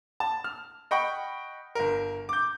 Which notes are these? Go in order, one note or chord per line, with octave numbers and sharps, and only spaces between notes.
A5
F6
D#5 F#5 G5 B5 C#6
G1 A#4
D6 G6